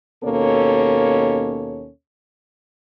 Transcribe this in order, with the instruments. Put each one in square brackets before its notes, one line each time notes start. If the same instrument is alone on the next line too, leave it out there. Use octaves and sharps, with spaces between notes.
[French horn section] D#2 B2 A#3 C#4 A4 C#5